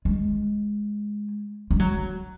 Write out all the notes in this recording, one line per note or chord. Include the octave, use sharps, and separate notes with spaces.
G#3
G#3
F#3